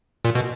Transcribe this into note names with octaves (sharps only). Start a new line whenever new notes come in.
A#2
B2